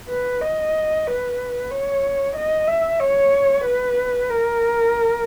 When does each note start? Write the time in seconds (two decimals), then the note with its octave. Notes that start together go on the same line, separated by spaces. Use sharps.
0.09 B4
0.41 D#5
1.07 B4
1.71 C#5
2.36 D#5
2.68 E5
3.00 C#5
3.65 B4
4.30 A#4